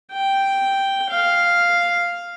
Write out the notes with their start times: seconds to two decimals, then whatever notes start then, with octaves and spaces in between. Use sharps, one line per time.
0.13 G5
1.10 F5